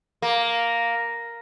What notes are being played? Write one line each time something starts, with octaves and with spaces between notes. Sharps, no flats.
A#3